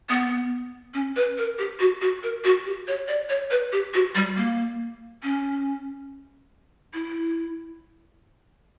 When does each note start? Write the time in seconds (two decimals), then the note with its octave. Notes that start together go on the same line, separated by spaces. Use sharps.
0.10 B3
0.94 C#4
1.16 B4
1.38 A#4
1.59 G4
1.80 F#4
2.01 F#4
2.23 A#4
2.44 F#4
2.66 G4
2.88 C#5
3.08 D5
3.29 C#5
3.51 B4
3.72 G4
3.94 F#4
4.15 G3
4.37 A#3
5.23 C#4
6.94 E4